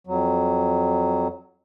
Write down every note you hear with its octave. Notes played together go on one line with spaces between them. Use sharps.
F2 F#3